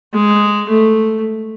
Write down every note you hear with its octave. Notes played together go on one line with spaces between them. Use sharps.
G#3
A3